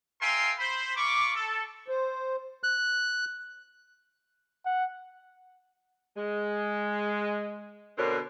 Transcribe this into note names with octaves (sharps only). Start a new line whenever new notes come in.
A#4 E5 F5 G5 G#5 C6
C5 B5
F4 B5 C#6 D6
A4
C5
F#6
F#5
G#3
B2 D3 C4 A#4 C#5